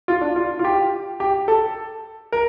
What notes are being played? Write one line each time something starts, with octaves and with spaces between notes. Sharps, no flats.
F4
D4
F4
F4
G4
G4
A4
A#4